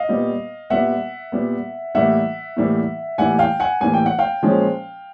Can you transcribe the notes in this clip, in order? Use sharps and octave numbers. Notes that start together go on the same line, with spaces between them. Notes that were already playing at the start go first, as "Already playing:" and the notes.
Already playing: D#5 F5
A#2 G3 B3
A#2 G3 B3 E5 F#5
A#2 G3 B3
A2 E3 G3 A#3 E5 F#5
A2 E3 G3 A#3
A2 E3 G3 A#3 F#5 G#5
F5 G5
F#5 G#5
A2 E3 G3 A#3 G#5
G5
F#5
F5 G5
A#2 F3 G#3 C#4